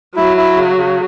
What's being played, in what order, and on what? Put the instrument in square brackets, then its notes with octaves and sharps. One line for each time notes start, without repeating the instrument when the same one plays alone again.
[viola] F#3 [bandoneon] E4
[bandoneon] E4
C#3
C#3